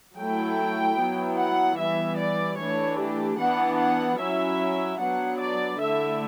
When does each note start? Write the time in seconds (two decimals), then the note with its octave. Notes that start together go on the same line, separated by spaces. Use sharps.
0.17 F#3 A3 E4 G5
0.98 F#3 B3 E4
1.38 F#5
1.78 E3 G3 B3 E5
2.18 D5
2.58 E3 A3 D4 C#5
2.99 G4
3.39 E3 B3 D4 F#5
3.79 F#5
4.19 F#3 C#4 E4 E5
4.99 F#3 B3 D4 F#5
5.40 D5
5.80 D3 A3 E4 E5